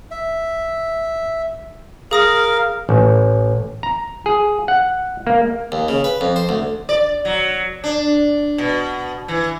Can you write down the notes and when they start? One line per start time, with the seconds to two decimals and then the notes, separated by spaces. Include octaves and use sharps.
0.11 E5
2.11 G#4 A#4 F5 D#6 A#6
2.89 A1
3.83 A#5
4.26 G#4
4.68 F#5
5.27 A#3
5.72 D#2
5.89 C#3
6.04 B4
6.21 F2
6.36 C5
6.49 D2
6.89 D5
7.25 F#3
7.84 D4
8.58 B2
9.28 E3